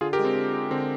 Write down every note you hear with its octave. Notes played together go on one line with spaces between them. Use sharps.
D3 F4 G#4
G4 A#4
G#3
C4
D3
G#3
D3 C4